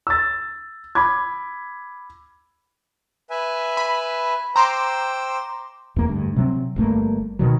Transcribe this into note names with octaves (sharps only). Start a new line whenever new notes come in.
E6 A6
B5 D6 G#6
B4 E5 G#5
B5
C5 G5 A#5 C6 D6 E6
E2 A#3
D2 G2
C3 F#3 C4
G1 G2 A3 A#3
B2 D#3 F#3